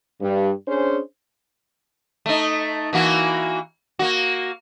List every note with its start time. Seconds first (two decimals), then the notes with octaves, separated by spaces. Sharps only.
0.21 G2
0.67 C#4 D4 G#4 C5
2.26 A3 D#4
2.93 E3 A#3 F#4
3.99 A#3 F#4